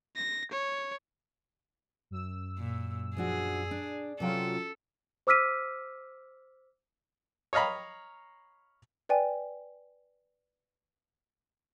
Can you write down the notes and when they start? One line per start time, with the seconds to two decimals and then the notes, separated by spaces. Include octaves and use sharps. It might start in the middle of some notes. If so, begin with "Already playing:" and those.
0.16 A#6
0.51 C#5
2.10 F#2 E6
2.59 A#2
3.17 F3 D4 F#4 G#4
3.71 D4
4.20 C3 F#3 C#4 F4 F#4 A4 G5
5.27 C5 D6 E6 F6 B6 D#7
7.53 C#5 D#5 F5 A#5 B5
9.09 B4 D5 G5 G#5